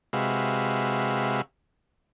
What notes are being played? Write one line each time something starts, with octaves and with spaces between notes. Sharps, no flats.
C3 G#3 F#4 B4 E5 F5